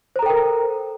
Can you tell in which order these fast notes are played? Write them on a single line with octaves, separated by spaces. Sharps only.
C5 A#5 A4 G5 A#4